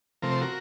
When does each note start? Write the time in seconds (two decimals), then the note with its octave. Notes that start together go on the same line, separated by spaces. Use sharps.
0.22 C3 F3 A3 C4 A#4
0.31 C5
0.41 F#4 A#4